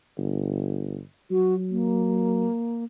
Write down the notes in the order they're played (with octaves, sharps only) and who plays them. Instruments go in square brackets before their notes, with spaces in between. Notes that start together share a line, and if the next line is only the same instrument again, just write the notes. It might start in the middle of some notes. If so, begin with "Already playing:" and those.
[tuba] G1
[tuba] F#3 [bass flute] F#4
[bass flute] A#3